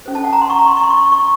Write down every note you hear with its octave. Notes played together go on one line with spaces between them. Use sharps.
C#4 A4 C5
A5
F#5
A#5
C6
C#6
A#5
C6
C#6
C6
C#6
C#6